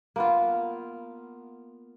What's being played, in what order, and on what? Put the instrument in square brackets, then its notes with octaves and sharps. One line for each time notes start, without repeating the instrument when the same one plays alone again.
[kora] A#3 B3 F4